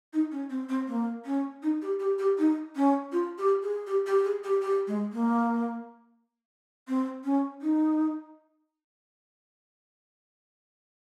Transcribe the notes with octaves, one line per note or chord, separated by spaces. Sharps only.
D#4
C#4
C4
C4
A#3
C#4
D#4
G4
G4
G4
D#4
C#4
F4
G4
G#4
G4
G4
G#4
G4
G4
G#3
A#3
C4
C#4
D#4